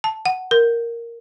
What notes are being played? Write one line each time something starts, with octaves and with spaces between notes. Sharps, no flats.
A5
F#5
A#4